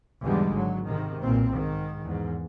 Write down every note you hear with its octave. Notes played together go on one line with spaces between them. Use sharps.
E2 G#2 D3 G3 G#3
G#1 F#3
G#2 C3 D#3
B1 A#2 C4
G#2 D#3
E2 G#2